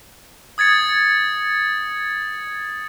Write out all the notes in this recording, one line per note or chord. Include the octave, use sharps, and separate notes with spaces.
D#6 G#6 A6 C#7